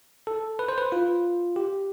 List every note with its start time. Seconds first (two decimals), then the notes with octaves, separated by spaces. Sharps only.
0.27 A4
0.59 B4
0.69 C5
0.78 B4
0.92 F4
1.56 G4